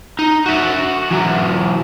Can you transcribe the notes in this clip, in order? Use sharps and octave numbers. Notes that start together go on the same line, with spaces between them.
D#4
F#4 E5
E3 F#3